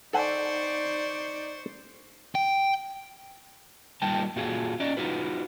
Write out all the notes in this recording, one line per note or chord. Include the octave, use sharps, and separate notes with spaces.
D#4 A4 C5 D5 F#5 G#5 C#6
G5
A#2 D#3 G3 A#4 G5 A5
A#2 F4 F#4 G#4 A4
C#4 D5 D#5
D#4 F4 F#4 B4